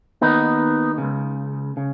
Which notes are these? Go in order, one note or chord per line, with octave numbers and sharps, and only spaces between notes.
D#2 D#3 B3 D#4
C#2 C#3
C#3